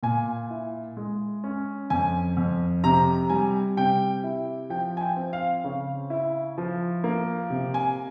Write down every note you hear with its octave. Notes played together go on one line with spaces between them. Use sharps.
A#2 G#5
E4
G#3
C#4
F2 G#5
F2
C3 A#5
G3 G#5
C3 G5
E4
F3 G5
G#5
G5
C4
F5
C#3
E4
F3
A#3
C3
G#5